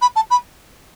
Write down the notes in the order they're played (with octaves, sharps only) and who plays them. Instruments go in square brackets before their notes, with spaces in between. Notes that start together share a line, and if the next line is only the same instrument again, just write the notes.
[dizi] B5
A5
B5